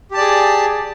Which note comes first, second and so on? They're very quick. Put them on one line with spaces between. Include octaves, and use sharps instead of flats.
G4 A5 D5 G#4